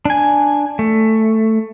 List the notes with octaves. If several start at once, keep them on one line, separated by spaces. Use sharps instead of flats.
D4 G#5
A3